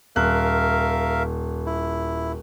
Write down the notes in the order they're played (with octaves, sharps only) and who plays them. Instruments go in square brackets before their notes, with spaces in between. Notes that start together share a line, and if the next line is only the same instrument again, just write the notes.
[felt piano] D#1 F#6 [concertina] A#4 E5 F5
[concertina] E4